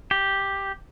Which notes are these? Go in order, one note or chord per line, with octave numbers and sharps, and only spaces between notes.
G4